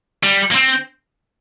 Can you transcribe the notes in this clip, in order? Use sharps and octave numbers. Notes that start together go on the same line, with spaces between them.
G3
A#3
C4